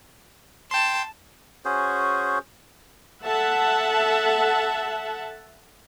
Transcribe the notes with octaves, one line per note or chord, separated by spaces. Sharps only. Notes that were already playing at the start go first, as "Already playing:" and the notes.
G5 A5 C6
C#4 F#4 G#4 C5
A4 E5 F#5 A5